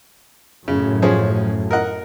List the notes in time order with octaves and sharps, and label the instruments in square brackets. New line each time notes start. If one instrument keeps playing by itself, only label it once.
[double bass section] F#2 A2 [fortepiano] C#3
[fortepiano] F3 C#4 G#4
A#4 D#5 F#5